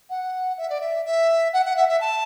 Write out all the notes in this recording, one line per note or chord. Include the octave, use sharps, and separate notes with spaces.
F#5
E5
D5
E5
E5
F#5
F#5
E5
E5
A5